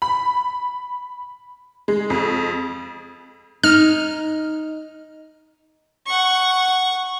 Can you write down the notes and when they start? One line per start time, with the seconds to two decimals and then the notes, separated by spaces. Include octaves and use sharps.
0.02 B5
1.88 G#3
2.10 F2
3.63 D#4 F6
6.06 F#5 C#6